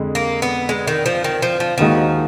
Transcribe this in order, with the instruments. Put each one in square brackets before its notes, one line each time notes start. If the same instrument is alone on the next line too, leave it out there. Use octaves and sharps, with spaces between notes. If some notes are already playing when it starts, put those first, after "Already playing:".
Already playing: [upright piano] F2 D3 G#3
[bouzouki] A#3
B3
G#3
D#3
F3
D#3
F3
F3
[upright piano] D#2 D#3 G#3 D#4 F#4 [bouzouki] F3